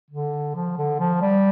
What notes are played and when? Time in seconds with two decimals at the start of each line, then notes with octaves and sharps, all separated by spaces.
0.11 D3
0.55 F3
0.77 D3
0.99 F3
1.22 G3